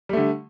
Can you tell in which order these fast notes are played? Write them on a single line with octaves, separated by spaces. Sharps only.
G3 A3 D3